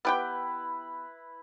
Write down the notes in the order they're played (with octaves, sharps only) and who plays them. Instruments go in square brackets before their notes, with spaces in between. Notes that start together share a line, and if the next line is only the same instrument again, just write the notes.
[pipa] B3 G4 G5 [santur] E4 B4